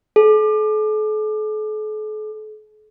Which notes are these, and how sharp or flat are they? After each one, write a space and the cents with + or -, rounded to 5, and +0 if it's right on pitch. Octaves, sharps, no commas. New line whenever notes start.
A4 -45